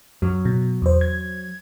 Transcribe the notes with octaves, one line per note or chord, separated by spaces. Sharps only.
F#2 F#3
B2
E2 C5
G#6